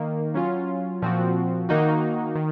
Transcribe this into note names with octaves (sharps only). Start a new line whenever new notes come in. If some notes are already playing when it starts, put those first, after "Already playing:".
Already playing: D#3 A#3 D#4
F#3 C#4 F4
A#2 F3 C4 F#4
D#3 A#3 D#4 F#4
D#3